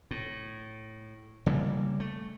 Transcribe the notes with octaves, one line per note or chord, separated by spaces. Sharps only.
A2
C#3 G3 A#3
A3